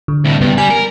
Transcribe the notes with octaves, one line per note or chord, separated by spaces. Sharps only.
D3
C2 A2
G2 C#3 B3
G3 G#5
A#4